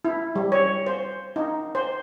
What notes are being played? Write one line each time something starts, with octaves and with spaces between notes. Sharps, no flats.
E4
G3
C#5
C5
D#4
C5